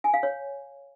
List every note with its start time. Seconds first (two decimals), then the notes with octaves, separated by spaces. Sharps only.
0.04 G#5
0.14 F5
0.23 C#5